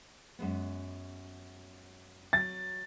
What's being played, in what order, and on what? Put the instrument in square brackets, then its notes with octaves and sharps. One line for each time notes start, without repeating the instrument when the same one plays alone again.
[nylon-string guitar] F#2 G#3 B3
[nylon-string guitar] F#3 [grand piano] A6